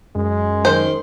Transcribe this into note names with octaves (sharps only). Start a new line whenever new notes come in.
F#2 G#3
D#3 C5